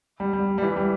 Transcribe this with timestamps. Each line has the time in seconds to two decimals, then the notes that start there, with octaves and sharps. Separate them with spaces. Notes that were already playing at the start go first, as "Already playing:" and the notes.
0.20 G3
0.33 G3
0.58 G3
0.62 E3
0.77 G3